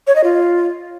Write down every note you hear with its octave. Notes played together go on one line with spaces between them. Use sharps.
C#5
D#5
F4